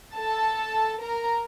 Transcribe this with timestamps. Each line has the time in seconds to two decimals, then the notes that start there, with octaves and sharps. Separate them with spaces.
0.16 A4 A5
1.02 A#4 A#5